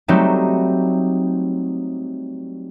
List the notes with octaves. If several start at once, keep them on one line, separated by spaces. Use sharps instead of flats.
F#3 G3 A3 C4 D#4